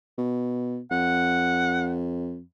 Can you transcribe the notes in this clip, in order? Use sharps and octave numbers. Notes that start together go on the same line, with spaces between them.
B2
F2 F#5